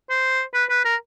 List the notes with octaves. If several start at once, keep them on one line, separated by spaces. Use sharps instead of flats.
C5
B4
B4
A#4